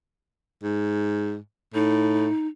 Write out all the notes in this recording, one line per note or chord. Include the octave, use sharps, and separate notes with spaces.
G#2
A2 D#4